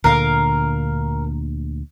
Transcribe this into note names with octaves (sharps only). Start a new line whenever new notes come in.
D2 A#2 D3 A#4 F5